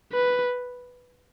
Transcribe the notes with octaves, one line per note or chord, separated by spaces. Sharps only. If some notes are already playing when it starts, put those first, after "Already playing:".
B4